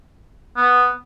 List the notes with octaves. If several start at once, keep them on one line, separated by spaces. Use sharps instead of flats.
B3